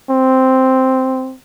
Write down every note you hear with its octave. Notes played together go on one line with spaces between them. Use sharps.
C4